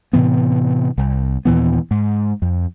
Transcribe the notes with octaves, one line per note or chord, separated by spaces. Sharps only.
A2 C3 E3 B3
C2
D#2 A#2 E3 B3
G#2
F2